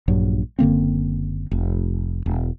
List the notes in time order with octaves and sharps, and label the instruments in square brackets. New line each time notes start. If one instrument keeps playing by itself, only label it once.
[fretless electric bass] A#1 G2 F#3
F#1 D3 A#3 C4
F1
E1